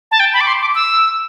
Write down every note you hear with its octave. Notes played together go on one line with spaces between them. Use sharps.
A5
G5
B5
D6
C6
D6
E6